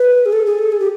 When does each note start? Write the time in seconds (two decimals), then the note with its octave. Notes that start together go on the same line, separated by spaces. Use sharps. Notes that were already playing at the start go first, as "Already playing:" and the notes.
Already playing: B4
0.26 G#4
0.33 A4
0.46 G#4
0.59 A4
0.72 G#4
0.80 G4